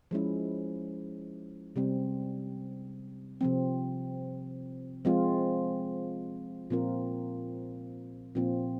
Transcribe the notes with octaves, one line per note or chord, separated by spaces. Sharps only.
F3 G#3 C#4 E4
C3 G3 C4
C3 F3 C4
F3 G#3 C4 F4
A#2 F3 C4 F4 A#4
A#2 F3 C4 F4